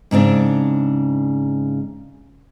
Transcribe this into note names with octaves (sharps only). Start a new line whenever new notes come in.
G#2 C#3 C4 D4